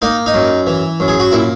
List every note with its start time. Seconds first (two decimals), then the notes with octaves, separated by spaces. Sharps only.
0.02 A#3 D#4
0.26 D#4
0.34 F#2
0.67 E3
1.00 F#2
1.08 G#4
1.20 F#4
1.32 A#2 E4